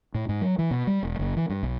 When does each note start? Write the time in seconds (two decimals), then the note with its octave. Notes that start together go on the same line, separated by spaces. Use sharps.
0.14 A2
0.29 G#2
0.41 F#3
0.59 E3
0.71 B2
0.87 G3
1.03 E1
1.19 F#1
1.37 E3
1.49 G2
1.63 B1